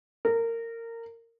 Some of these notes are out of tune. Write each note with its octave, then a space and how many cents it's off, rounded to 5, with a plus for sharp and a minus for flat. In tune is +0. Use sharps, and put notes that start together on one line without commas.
A#4 -20